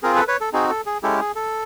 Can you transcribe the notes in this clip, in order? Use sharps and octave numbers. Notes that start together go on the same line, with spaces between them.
C4 F4 G#4 A#4
A4 B4
B4 C#5
A4
C4 D#4 F#4 G#4
A4
G#4
G#3 C#4 E4 G4 A4
G#4
A4